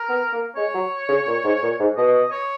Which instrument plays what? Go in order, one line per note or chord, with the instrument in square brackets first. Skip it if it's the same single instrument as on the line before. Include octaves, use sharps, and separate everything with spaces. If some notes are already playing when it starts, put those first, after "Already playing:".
Already playing: [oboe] A#4
[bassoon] B3
A#3
[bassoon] G#3 [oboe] C#5
[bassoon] F#3
C#3
A#2
G#2
A#2
G#2
[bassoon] B2 [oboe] D#5
[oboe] C#5